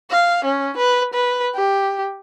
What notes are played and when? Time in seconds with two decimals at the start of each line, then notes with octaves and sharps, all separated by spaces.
0.11 F5
0.45 C#4
0.77 B4
1.14 B4
1.55 G4